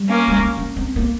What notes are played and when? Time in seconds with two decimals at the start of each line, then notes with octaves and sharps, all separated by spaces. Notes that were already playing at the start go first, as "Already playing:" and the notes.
Already playing: G3
0.09 A#3 C#4
0.28 G#3
0.38 A#3
0.57 C#4
0.76 C4
0.96 A#3